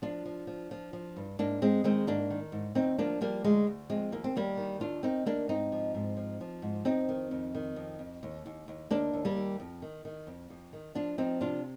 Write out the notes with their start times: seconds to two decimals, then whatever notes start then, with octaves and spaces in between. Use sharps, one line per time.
0.02 F3 D4 F4
0.26 F3
0.47 F3
0.71 F3
0.93 F3
1.16 G2
1.39 G#2 A#3 D4
1.62 G#2 G#3 C4
1.84 D#3 G#3 C4
2.07 G#2 A#3 D4
2.30 D#3
2.52 G#2
2.75 D2 C4 D#4
2.98 F3 A#3 D4
3.21 F3 G3 A#3
3.44 D2 G#3
3.67 D2
3.90 F3 G#3 C4
4.12 D#2 A#3
4.24 C4
4.36 D#2 G3 A#3
4.57 D#3
4.80 D#2 D4 F4
5.03 D#3 C4 D#4
5.26 D#2 A#3 D4
5.49 G#2 C4 D#4
5.72 F3
5.95 G#2
6.17 F3
6.41 F3
6.62 G#2
6.85 F2 C4 D#4
7.09 D#3
7.31 F2
7.55 D#3
7.76 F2
7.99 F2
8.23 D#2
8.46 D#2
8.68 D#2
8.91 D#2 A#3 D4
9.13 D#2
9.25 G3 A#3
9.37 D#2
9.60 F2
9.82 D#3
10.05 D#3
10.27 F2
10.50 F2
10.73 D#3
10.95 F3 D4 F4
11.18 F3 C4 D#4
11.41 C3 D4 F4